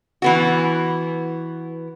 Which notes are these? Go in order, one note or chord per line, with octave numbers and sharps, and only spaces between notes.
E3 B3 F#4